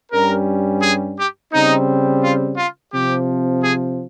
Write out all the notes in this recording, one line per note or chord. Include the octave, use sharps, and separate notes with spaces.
G2 G3 C#4 A#4
G#4
G4
C#3 G3 C4 D#4
F4
F4
C3 F3 C4 G4
G#4